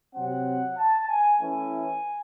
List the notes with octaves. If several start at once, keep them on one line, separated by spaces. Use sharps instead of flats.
C3 F#3 C4 F#5
A5
G#5
E3 A3 C#4 E4 G#5